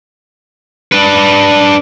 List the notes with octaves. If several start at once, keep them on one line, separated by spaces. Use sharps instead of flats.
D4 B4